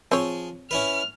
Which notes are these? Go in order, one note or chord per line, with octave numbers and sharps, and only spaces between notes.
F3 C4 G#4 C#5
C#4 E4 B4 F6